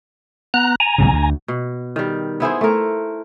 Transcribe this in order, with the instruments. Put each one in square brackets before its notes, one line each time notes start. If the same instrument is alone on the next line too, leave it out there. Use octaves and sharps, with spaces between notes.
[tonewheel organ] B3 A#5 F#6
G#5 A#5
[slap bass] B1 G#2 C#3
D2
[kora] B2
D#3 G3
B3 E4 G#4 C5
A3 A#4